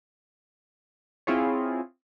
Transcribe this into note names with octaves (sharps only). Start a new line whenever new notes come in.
C4 E4 F4 G#4 C#5